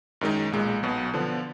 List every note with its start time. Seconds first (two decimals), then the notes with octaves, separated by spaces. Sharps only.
0.21 F#2 D#3 G#3 D#4
0.52 B1 A#2 G#3
0.83 B1 B2 F#3
1.14 D3 F3 B3 D4